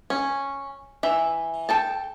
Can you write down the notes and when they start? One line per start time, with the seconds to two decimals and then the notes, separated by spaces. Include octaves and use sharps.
0.10 C#4
1.03 E3 E5
1.69 A4 G5 A5